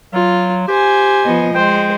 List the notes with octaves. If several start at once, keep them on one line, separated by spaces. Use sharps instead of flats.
F#3 F4
G4 C5 G#5
F3 B3 D#5
G#3 C5 G5